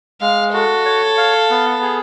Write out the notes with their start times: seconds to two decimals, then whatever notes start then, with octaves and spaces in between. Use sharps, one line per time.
0.21 G#3 F5
0.53 F#4 A4
0.86 C#5
1.17 F5
1.50 B3
1.82 G#4